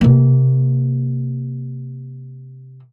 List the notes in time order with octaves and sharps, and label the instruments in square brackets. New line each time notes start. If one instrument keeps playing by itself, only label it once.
[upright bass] C3 A#3